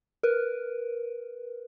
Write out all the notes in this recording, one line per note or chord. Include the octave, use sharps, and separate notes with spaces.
A#4 B4